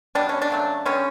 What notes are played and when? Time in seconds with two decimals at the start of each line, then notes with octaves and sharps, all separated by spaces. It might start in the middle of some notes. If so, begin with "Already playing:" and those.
0.15 B2 G3 B3 D4
0.29 C#4
0.42 D4
0.50 C#3 F#3 A3
0.85 D3 G3 B3 C#4